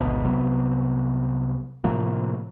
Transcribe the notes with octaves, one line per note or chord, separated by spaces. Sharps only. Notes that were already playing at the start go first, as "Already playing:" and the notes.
G#1 D2 B2
C2 C3 F#3 B3
A2 C3 F3 A#3